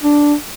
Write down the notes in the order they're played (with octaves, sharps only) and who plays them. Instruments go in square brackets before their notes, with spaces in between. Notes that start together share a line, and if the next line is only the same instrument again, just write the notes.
[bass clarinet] D4